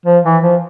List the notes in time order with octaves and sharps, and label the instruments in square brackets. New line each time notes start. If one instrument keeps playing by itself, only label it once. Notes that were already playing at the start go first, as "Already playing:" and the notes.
[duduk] F3
E3
F3